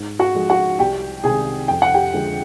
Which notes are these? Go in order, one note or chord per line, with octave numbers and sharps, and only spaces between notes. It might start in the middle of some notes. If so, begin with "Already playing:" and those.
Already playing: G#2
F#4 F#5
F3 G#3
F#4 F#5
C2 G4 G5
C3 D#3 G#3 G#4 G#5
F2 G5
F#5
G4 G5
D3 F3 G#3